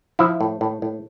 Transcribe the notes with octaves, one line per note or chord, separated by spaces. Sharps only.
F3 E4 E5
A2
A2
A2